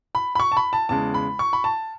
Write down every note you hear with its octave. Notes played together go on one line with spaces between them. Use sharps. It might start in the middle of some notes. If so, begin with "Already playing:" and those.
B5
B5
C#6
A5
B5
A5
E2 C#3 G#3 A5
B5
C#6
B5
A5